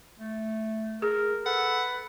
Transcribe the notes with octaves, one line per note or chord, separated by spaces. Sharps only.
A3
G#4 A#4
A4 B4 F#5